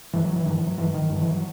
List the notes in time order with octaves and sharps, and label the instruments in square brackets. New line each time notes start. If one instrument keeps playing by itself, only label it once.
[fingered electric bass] G2 E3
F#3
E3
G2 D#3
E3
F#3
G2 E3
D#3
G2 D#3
E3
F#3